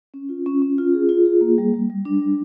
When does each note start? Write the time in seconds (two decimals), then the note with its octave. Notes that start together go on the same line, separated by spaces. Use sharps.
0.14 C#4
0.29 F4
0.46 C#4
0.62 C#4
0.78 F4
0.94 G#4
1.09 F4
1.26 G#4
1.41 A#3
1.58 G3
1.74 G3
1.90 G3
2.05 D4
2.21 G3